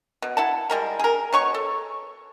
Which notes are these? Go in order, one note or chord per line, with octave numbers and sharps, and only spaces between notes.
B2
E4 F#5 A5
G3 G#3 A#4
G#4 A#4
B2 C#5 C#6
A4